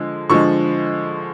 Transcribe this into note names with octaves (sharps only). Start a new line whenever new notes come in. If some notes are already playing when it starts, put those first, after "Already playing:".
Already playing: D3 F3 G#3
D3 F3 G#3 C#6